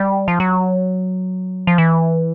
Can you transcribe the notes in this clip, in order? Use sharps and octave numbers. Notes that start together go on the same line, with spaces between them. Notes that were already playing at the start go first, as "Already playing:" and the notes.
Already playing: G3
F3
F#3
F3
E3